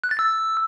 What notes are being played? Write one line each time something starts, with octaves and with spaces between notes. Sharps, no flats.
F#6
A6
E6